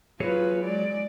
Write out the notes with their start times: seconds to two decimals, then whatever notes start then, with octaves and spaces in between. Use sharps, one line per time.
0.20 F#3 F4 G#4 B4 C#5
0.65 G#3 D5